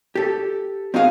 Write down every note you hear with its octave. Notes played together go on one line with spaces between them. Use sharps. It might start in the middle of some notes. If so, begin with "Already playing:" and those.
G4 A4
C4 D#4 F4 F#4 G#4 F5